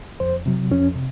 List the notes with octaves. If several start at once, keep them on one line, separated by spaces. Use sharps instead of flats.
F2 C5
C3 F#3
F2 C#4
C3